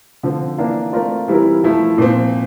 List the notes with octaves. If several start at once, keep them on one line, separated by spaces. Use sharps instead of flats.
D3 F3 C4
E3 A#3 D4
A3 C4 F4 A#4 D5
E3 G3 C4 E4 A#4
F3 A3 E4
A#2 F3 C4